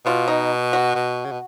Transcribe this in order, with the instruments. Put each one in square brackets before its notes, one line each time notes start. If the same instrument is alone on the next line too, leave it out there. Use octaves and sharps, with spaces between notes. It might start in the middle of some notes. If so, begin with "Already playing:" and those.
[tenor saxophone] B2 [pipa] F4
[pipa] D#4
F#4
[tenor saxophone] B2
C#3
B2